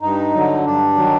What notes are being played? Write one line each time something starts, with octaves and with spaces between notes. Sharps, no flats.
G2 D#4
D3 F#3
G2 D4
D#3 F#3